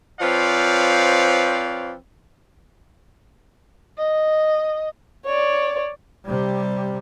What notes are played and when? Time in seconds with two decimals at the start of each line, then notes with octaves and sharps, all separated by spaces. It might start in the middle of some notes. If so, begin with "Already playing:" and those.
0.20 F3 C4 B4 C#5 D5 F5
3.98 D#5
5.26 C#5 D5
6.25 C3 G3